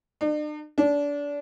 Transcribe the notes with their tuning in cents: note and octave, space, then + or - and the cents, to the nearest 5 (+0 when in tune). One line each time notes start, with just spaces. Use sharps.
D4 +45
D4 -25